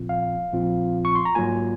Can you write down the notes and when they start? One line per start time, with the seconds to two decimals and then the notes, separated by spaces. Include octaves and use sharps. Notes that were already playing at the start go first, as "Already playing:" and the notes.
Already playing: A#1 A#2 F3 C4 F4
0.09 F5
0.52 A#1 A#2 F3 C4 F4
1.05 C#6
1.15 C6
1.25 A#5
1.35 G#2 F#3 A#3 F4 G#5